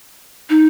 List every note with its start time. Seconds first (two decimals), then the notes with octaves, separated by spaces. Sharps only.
0.50 D#4